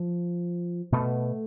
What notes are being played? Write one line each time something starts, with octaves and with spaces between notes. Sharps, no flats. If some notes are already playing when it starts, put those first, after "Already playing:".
Already playing: F3
B2 A3